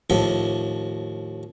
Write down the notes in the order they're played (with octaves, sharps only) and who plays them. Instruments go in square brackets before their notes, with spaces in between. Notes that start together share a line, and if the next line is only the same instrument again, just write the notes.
[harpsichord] D#2 A2 F3 A4